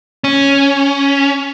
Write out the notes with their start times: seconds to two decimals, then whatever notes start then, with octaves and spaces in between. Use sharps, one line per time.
0.24 C#4